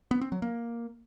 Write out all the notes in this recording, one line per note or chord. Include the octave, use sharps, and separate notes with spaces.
B3
C4
F#3
A#3